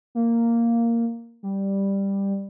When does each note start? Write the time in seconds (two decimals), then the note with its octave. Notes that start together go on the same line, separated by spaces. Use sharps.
0.15 A#3
1.43 G3